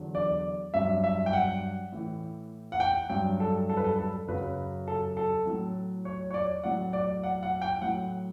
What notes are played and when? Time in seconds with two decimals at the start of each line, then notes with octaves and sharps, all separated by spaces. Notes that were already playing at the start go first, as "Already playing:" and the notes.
Already playing: E2 D3 F#3
0.15 D5
0.74 G2 F#3 E5
1.04 E5
1.26 G5
1.33 F#5
1.92 A2 E3
2.72 F#5
2.80 G5
3.10 G2 F#3 G5
3.40 A4
3.69 A4
3.77 B4
3.84 A4
3.99 A4
4.27 F#2 C#3 F#3 B4
4.88 A4
5.17 A4
5.45 A2 F#3
6.05 C#5
6.30 C#5
6.34 D5
6.64 A2 F#3 F#5
6.93 D5
7.23 F#5
7.43 F#5
7.62 G5
7.81 A2 F#3 F#5